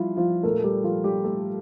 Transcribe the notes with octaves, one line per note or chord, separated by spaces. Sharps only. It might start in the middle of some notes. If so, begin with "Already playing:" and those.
Already playing: F3 G3 E4 F4
F3 F4
A#2 A3 A#3 A#4
G3 G4
F3 F4
G3 G4
A3 A4